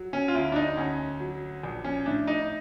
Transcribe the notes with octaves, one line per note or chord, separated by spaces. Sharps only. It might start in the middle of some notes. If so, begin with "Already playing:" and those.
Already playing: F#3
C#4
F4
D2 E4
D4
D#4
D2 C#4
F#3
A#1
C#4
A2 D4
D#4